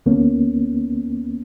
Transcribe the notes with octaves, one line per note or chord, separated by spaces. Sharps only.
D2 A#3 B3 C#4